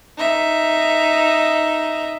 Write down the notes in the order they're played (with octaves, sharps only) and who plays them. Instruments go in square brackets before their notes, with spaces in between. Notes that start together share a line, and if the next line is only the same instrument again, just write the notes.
[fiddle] D#4 E5